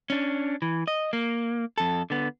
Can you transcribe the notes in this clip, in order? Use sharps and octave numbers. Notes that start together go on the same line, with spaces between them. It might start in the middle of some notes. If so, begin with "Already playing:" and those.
C#4 D4
E3
D#5
A#3
F2 A4
D3 B3